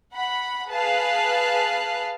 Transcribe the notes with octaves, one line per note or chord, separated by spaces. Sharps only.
F#5 B5
G#4 B4 F5 A5 F#6